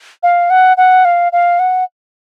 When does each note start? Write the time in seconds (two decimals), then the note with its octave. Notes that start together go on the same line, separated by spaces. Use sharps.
0.23 F5
0.50 F#5
0.77 F#5
1.05 F5
1.32 F5
1.59 F#5